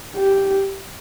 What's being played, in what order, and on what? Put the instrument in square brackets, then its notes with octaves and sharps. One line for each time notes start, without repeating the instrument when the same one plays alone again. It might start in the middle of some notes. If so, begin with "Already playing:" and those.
[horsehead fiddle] G4